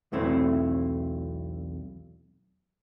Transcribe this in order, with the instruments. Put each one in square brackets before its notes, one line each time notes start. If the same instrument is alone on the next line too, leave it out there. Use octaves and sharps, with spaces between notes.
[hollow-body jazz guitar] B1 E2 A3 C4 E4